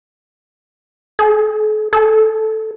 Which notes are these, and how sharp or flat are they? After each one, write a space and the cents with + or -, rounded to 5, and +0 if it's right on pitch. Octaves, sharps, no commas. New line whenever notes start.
A4 -45
A4 -5